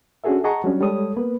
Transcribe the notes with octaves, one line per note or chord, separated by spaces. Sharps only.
C#4 D4 F#4 G#4 A4 E5
G#4 D#5 F#5 A5 A#5 C#6
F#3 G3 C#4 D4
G3 G#3 A4 C#5 D#6
A#3 B3 B4